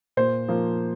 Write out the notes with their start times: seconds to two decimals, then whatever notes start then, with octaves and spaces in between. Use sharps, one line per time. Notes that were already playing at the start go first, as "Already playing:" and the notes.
0.17 A#2 C5
0.48 F3 A#3